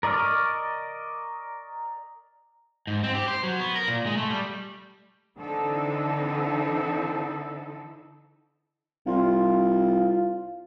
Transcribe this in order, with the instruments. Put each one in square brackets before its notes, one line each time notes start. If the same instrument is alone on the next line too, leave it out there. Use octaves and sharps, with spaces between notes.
[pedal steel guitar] A#4 D5 D#5 C#6 F6
[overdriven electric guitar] G#2
C4
G4
C5
F#3
B3
A#4
A#2
G#3
A3
G3
[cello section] D3 E3 C4 D#4 E4 A4
[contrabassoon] C2 [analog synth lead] F4